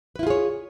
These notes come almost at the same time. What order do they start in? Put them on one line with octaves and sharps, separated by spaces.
B4 E4 F4 G#4 C#5